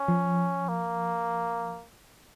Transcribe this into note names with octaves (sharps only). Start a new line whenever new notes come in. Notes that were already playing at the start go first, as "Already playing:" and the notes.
Already playing: C#4
F3
A#3